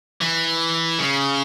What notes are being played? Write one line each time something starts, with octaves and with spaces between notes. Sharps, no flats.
E3
C#3